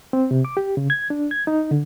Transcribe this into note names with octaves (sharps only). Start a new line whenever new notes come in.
C4
C3
D6
G4
C#3
G#6
D4
G#6
D#4
D3